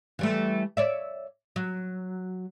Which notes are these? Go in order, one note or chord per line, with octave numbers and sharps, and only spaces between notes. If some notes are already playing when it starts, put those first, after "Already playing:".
E3 G3 A3
C#5 D5 E5
F#3